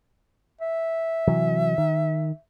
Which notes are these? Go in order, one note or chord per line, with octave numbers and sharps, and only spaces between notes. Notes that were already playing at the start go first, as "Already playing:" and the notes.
E5
C3 E3 F#3
D#3